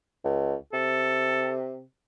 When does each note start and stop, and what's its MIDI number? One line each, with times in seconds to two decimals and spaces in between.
0.24 0.54 37
0.73 1.82 48
0.73 1.56 69